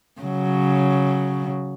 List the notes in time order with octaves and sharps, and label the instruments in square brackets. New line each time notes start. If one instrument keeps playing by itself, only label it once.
[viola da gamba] C#3 F#3